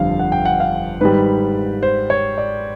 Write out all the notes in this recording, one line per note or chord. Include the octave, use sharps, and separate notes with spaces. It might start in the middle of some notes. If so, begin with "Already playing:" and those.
Already playing: G1 F2 D3 G3 F5
F#5
G5
F#5
F5
G#2 D#3 G3 B4
C5
C#5
D5